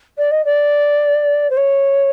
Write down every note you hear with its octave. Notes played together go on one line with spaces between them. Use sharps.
D5
D#5
D5
C5
C#5